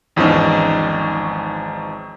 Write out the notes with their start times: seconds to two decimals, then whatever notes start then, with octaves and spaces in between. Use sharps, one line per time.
0.16 G#1 E2 F3 C#4 D#4